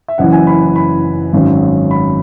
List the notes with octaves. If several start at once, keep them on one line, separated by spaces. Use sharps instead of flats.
E5
F#1 F#2 E3 F#5
G#5
B5
B5
G#1 F#2 F#3
B5